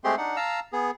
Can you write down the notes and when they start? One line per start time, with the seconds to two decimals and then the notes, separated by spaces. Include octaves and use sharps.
0.04 G#3 A3 C4 G4 G#4 C6
0.17 D4 D#4 F#5
0.36 F5 A5 A#5 E6
0.73 B3 G#4